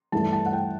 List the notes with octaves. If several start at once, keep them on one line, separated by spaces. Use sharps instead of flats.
G2 E3 A3 A5
A5
F#5
G5